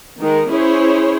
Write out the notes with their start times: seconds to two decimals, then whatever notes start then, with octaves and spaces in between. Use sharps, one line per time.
0.20 D#3 G#3 A#4
0.50 C#4 E4 G#4 C5 C#5